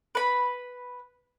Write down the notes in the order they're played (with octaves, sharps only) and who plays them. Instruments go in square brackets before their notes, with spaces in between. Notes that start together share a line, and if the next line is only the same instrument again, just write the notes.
[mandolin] B4 B5